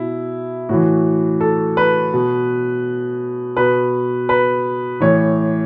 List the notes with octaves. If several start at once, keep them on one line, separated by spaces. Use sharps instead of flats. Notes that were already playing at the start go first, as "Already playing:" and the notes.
Already playing: B2 E4
A2 E3 F#4
A4
B4
B2
B2 B4
B4
A2 E3 C#5